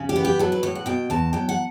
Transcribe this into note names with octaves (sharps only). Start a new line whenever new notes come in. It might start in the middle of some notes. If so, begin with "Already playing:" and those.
Already playing: C#3
G4
B3
G4
F#3 A4
B4
A2 C#5
F#5
B2 G5
E2 A5
F#3 G5
F#5